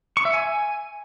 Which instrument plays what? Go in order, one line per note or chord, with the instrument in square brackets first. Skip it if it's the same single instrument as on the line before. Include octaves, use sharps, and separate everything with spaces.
[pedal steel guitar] C#6
E5
G#5